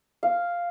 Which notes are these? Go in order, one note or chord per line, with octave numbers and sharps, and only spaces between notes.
F5